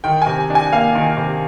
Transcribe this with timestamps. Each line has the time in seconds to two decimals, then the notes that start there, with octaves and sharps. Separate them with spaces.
0.04 D#3 G5
0.22 C3 G#5
0.50 D4
0.55 G#5
0.72 A#3 F5
0.95 D#3
1.17 C3